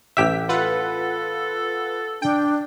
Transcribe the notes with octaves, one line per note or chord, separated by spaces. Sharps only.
A1 G4 E5 B6
F4 A4 B4 F#5
D4 G5